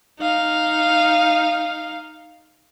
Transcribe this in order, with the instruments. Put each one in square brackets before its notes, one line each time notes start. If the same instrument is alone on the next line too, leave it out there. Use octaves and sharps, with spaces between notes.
[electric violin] D#4 F5